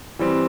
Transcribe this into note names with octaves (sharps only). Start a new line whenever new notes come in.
E3 G3 C4